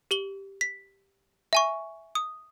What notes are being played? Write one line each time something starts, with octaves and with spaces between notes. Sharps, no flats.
G4 F#7 G7
B6
E5 G#5 C#6
D#6